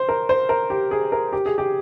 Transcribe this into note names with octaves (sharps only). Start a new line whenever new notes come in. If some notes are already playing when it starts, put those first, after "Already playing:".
Already playing: C5
A#4
C5
A#4
G4
G#4
A#4
G4
G#4
G4